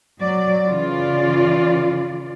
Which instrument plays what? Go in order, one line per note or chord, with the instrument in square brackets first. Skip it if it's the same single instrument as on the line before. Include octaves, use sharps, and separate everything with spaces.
[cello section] F#3 D5
C#3 E3 F4 D5